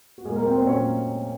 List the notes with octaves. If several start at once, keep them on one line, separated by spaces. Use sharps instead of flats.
F#4
A#2 F#3 G#3 A#3 G#4
A#3 A#4
C4 C5
C4 C5
A#2 F#3 A#3 C#4 C#5